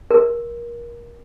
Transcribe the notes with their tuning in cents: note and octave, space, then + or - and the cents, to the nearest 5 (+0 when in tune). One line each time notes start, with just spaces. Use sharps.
A#4 +25